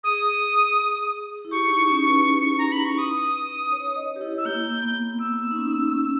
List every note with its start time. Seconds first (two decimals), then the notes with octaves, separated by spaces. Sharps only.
0.04 G#4 D#6
1.45 E4
1.51 G4 C#6
1.69 D#4
1.88 C#4
2.07 B4
2.58 A#5
2.72 B5
2.85 C#6
2.98 D#6
3.72 C#5
3.96 D#5
4.16 G4
4.21 E4
4.38 E6
4.45 A#3 G6
4.82 B3
5.19 B3 E6
5.51 D#4
5.56 C#4
5.93 C#4